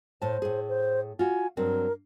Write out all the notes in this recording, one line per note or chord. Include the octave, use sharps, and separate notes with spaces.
A2 C5 A5
A2 G#4
C5
F4 F#4 G#5
G2 F#3 C4 A#4